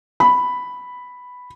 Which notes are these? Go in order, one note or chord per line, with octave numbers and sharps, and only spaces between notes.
B5